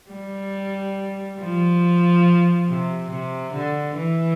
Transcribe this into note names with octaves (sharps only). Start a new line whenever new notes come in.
G3
F3
C3
C3
D3
E3